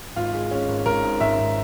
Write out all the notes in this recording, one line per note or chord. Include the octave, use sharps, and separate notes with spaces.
G#1 F4
G#3
G#3 C#4
G#1
G#1 A#4
G#2
G#1 E5
G#1